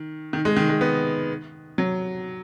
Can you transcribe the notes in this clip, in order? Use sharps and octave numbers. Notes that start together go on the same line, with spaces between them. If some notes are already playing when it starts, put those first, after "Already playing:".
Already playing: D#3
D#3
G#3
D#3
G#3
B3
F#3